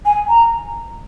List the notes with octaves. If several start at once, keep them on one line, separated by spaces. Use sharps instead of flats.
G#5
A#5